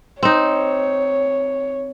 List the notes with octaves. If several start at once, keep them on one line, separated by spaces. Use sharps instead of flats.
C4 D#4 C#5